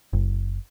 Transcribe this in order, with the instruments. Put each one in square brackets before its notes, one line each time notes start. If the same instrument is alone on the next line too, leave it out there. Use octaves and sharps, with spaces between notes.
[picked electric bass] F#1